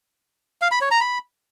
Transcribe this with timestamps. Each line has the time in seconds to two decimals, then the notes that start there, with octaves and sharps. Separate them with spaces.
0.62 F5
0.71 B5
0.81 C#5
0.91 A#5
1.01 B5